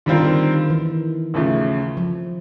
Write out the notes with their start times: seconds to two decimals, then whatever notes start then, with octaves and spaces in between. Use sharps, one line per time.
0.06 D3 D#3 G3 C4 F4 A#4
0.24 D#3
0.70 E3
1.34 D#2 C#3 F3 A3
1.97 F3